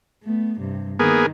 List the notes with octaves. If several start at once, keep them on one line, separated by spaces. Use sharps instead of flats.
A3 B3
G2 C3
D#3 A#3 B3 G#4